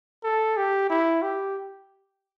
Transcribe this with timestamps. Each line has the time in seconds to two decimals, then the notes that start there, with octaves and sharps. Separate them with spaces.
0.24 A4
0.57 G4
0.90 E4
1.22 G4